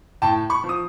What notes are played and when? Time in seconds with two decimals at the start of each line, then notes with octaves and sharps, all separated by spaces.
0.22 A2 G5 A5
0.50 B5 C#6
0.64 F3
0.69 D#6